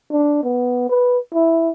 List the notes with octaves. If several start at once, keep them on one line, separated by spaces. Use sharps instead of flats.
D4
B3
B4
E4